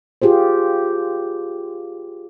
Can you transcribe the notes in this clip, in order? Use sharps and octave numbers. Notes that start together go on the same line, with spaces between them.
F4 G4 G#4 C5